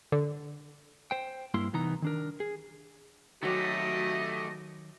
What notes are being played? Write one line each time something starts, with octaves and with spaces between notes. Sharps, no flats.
D3
C5 G5
G2 A#3 E4 C6
C2 E3 B3 D#4 A#5
D#3 D4 A#4
G#4
D#3 F#3 A3 F#4 G4 D#5